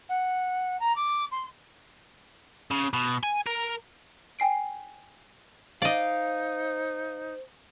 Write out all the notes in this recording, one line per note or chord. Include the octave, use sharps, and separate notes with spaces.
F#5
A#5
D6
C6
C#3
B2
G#5
A#4
G5 G#5 C7 D7
D#4 C5 D5 D#5 F5